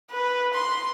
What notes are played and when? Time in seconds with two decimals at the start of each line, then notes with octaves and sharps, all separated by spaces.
0.11 B4
0.54 C6